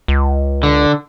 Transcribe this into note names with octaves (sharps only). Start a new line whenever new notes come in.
C#2
D3